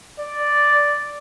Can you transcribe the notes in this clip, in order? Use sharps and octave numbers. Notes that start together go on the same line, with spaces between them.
D5